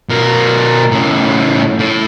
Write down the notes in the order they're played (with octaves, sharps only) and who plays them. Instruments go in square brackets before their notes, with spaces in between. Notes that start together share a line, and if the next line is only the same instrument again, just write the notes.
[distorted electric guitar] B2 A#4
A2 C#3
A2